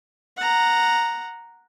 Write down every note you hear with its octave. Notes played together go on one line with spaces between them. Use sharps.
F#5 A#5